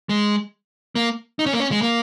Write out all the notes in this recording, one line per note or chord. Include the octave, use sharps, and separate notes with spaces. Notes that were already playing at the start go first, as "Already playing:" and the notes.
G#3
A#3
D#4
C#4
A#3
C#4
G#3
A#3